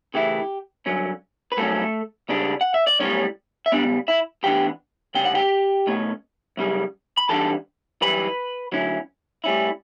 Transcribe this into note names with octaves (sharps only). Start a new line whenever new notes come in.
C#3 E3 A3 E4 G4
G2 D3 F#3 C#4
B4
G2 F#3 A3 C#4 A4
C#2 C#3 G3 D4
F#5
E5
D5
B1 A2 G3 C#4 C#5
E5
C#2 C#3 G3 B3 D4 D5
E4 E5
A2 E3 B3 D4 G4 G5
D2 C#3 G3 C#4 G5
F#5
G4 G5
B2 A3 C#4
F#2 C#3 G3
B5
A2 E3 G3 D4 A4 A5
F#2 E3 G3 B4 B5
D2 D3 F#3 C#4 E4
A2 G3 C#4 E4